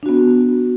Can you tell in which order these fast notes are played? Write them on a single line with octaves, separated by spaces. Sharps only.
D4 F#4 B3